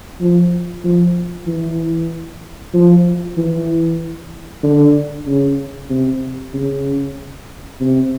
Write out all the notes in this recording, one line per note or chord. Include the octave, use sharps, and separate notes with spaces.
F3
F3
E3
F3
E3
D3
C#3
C3
C#3
C3